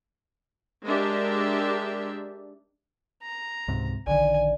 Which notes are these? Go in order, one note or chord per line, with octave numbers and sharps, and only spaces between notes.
G#3 D4 G4 A#4 E5
A#5
C#2 G#2 C3
A#1 D3 D#3 D5 G#5